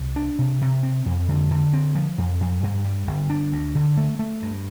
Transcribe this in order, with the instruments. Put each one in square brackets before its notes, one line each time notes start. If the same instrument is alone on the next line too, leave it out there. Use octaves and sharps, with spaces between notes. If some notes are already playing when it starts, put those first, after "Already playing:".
Already playing: [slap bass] C2
D4
C3
C3
C4
F2
D3
D3
C4
F3
F2
F2
G2
G3
G1
D4
D2
D3
A3
A3
G2